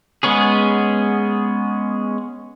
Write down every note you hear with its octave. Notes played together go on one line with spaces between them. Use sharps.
G#3 B3 C#4 G#4